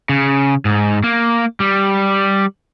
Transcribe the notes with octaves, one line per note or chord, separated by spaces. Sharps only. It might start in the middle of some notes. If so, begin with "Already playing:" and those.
C#3
G#2
A#3
G3